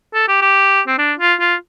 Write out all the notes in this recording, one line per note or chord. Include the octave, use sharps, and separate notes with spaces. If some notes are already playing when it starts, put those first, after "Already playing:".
A4
G4
G4
C4
D4
F4
F4